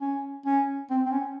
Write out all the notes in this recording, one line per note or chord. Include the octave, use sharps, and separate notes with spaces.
C#4
C#4
C4
C4
C#4